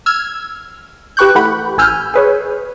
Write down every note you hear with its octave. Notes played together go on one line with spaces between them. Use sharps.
E6 F6 G#6
G4 B4 G5 C#6 F#6 G6
E3 A3 F#5 B5
A1 G#5 E6 F6 G6
G#4 B4 C#5